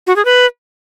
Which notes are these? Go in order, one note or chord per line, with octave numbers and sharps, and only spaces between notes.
F#4
G#4
B4